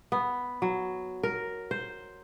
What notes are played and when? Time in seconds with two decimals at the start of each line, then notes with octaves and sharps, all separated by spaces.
0.12 B3
0.62 F#3
1.23 A#4
1.71 C5